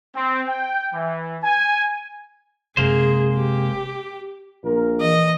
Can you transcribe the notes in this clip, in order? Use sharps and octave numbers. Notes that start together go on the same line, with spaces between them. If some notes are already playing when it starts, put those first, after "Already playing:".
C4
G5
E3
G#5
F#1 C3 G#3 A#3 G#4 C5
G4
A#1 A#2 A#4
E3 D#5